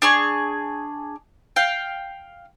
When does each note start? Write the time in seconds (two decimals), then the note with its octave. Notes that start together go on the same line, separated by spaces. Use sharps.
0.02 D4 G#4 C#6
1.56 F5 G5